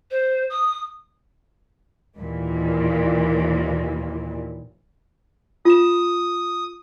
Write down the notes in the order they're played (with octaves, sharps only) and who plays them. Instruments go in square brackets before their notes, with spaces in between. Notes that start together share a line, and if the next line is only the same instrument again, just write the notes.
[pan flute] C5
D#6
[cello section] D#2 A#2 E3
[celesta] F4 E7 [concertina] D#6